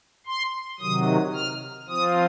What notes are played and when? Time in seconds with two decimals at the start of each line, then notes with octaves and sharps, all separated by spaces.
0.26 C6
0.79 C3 D#3 F#3 D#6
1.33 F6
1.88 F3 C4 F4 D#6